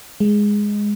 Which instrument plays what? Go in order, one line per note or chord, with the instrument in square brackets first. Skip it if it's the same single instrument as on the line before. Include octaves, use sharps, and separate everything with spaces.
[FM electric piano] G#3